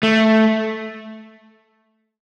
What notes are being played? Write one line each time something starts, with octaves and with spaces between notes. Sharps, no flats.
A3